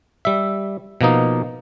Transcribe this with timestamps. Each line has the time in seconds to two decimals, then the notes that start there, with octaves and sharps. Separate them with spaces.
0.25 G3 E5
1.01 B2 F3 A#3 D#4